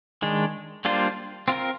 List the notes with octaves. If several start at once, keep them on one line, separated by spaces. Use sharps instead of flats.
D#3 G#3 D4
G3 A#3 D4 F4 C5
C4 F4 A#4